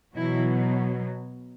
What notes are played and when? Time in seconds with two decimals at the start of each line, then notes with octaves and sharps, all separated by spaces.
0.16 B2 E3 F#3 E4